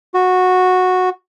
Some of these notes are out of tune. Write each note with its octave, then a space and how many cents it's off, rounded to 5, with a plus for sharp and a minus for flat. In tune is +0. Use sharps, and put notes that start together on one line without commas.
F#4 -10